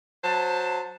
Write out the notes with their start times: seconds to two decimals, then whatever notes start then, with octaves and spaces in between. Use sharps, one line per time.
0.24 F#3 C5 A5